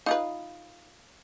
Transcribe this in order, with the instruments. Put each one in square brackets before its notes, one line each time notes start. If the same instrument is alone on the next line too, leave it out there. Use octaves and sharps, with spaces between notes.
[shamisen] D#4 F4 B4 [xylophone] F5 D#6